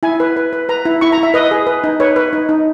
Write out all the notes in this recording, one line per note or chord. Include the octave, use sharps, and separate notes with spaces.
E4 G#5
B4
B4
B4
B4 A#5
E4
E4 C#6
A#5
E4
E5
B4 D#5
G#4
B4
D#4
B4 C#5
B4
D#4
D#4